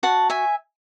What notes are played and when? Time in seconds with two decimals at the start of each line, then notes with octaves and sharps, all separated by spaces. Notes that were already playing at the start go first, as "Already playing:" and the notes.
0.03 F#4 F#5 A5
0.30 E5 G#5